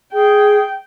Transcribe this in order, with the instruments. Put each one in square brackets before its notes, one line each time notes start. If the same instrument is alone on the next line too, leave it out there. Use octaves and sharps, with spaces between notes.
[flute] G#4 [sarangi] G5